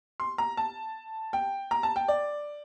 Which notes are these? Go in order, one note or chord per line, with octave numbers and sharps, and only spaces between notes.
C6
A#5
A5
G5
A#5
A5
G5
D5